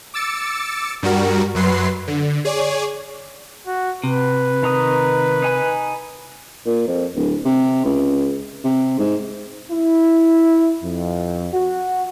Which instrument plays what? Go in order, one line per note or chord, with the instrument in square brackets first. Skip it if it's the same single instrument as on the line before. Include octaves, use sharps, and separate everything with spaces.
[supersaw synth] D6 E6 A6 C#7
G2 G3 F#4 A#4
F#2 F#3 B4 C6 C7
D3
G#4 C#5 D5
[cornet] F#4
[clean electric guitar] C3 [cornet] B4
[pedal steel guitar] D#3 A#5 D#6
D#4 G#5 B5
[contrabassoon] A#2
F2
D1
C3
C#2
C3
G#2
[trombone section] E4
F2
F#4